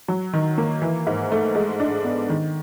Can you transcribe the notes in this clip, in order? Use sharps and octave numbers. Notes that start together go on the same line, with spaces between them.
F#3
D#3
A#3
E3
G#2
A3
G#3
D4
B3
D#3